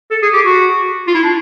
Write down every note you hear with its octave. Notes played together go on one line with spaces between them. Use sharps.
A4
G#4
G4
F#4
F4
E4
D4